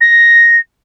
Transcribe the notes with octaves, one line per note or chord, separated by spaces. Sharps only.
A#6